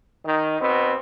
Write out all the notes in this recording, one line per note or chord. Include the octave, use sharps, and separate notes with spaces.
D#3
B2 B3 C4